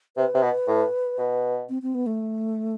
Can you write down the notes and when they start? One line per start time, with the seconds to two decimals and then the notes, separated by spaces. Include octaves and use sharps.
0.17 C3 B4
0.35 C3
0.42 B2
0.68 A2
1.18 B2
1.69 C4
1.82 C4
1.95 B3
2.06 A3